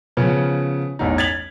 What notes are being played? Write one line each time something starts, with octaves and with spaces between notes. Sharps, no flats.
C#3 F3 B3 C#4
A1 E2 D#4
G#6 A6 B6 F7 F#7